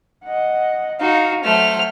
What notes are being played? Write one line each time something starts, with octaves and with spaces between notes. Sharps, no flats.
D#5 F#5
D#4 F#4 F5
F#3 A3 C5 F6